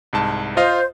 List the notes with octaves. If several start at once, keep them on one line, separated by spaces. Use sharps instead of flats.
C2 G#2 A5
F4 C5 D#5 F5